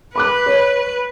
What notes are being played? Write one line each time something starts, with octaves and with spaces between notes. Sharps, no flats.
B4 B5 D6 F#6
C#5